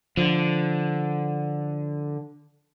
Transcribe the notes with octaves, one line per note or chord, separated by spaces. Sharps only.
D3 F3